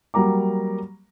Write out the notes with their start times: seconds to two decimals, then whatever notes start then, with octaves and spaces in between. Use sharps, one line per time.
0.14 F#3 G3 A#3 A#5 D6